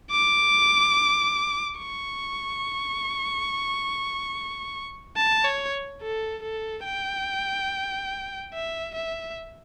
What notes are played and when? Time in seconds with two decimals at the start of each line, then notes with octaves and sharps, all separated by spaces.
0.11 D6
1.80 C#6
5.17 A5
5.44 C#5
6.01 A4
6.42 A4
6.85 G5
8.54 E5
8.95 E5